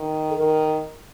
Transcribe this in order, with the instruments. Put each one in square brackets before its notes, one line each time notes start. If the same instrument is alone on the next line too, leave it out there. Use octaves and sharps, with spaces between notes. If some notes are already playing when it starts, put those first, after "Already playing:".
Already playing: [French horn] D#3
[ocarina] A4
[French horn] D#3 [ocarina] A#4